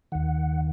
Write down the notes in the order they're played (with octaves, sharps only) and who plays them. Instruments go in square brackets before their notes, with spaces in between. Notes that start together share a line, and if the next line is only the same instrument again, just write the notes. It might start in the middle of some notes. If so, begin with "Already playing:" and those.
[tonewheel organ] D#2 D#3 F#5